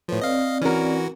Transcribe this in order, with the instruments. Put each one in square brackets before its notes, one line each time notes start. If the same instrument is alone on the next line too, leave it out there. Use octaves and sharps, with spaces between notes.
[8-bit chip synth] A2 F3 [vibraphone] A4 B4 C#5
[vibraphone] C4 D5 [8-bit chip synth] D#5 F5
[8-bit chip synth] E3 F#4 [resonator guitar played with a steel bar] C#4 A#4